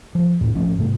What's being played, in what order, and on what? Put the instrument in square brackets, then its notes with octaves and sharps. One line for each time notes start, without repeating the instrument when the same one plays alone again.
[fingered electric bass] F3
D#2 A2
G#1 F3 A3 C#4
G#2 C3 A3